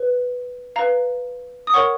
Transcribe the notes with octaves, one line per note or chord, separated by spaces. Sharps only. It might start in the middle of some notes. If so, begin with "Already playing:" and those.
Already playing: B4
B4 F5 A#5
D#6
A#4 C#5 F#5 C#6